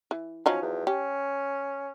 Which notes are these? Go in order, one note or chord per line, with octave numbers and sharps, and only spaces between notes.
E3
F3 F#3 C#4 D#4
E2
C#4 G4